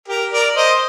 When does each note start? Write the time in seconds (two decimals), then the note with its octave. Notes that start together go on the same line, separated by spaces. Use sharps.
0.08 G4 A#4
0.32 A#4 D5
0.56 C5 D#5